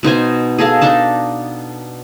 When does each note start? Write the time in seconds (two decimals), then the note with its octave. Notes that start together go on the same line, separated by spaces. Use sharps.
0.03 B2 D#4 C5 G#5
0.58 G#4 A4 D#5 F5
0.81 D4 D#4 A5